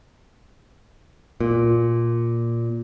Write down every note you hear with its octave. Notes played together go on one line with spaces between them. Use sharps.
A#2